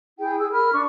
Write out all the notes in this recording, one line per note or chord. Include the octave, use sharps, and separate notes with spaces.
E4 G#4 G5
G#4 E6
A#4 B5 F6
D4 C#6